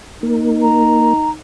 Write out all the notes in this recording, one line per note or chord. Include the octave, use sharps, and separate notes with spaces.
A#3 D#4
A#5